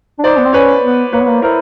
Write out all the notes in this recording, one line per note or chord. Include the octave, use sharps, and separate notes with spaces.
D4
D#4 C5 D5
B3
C4
C#4 B4 C#5
B3
A#3 B4 C#5
B3
A#3
E4 A#4 C5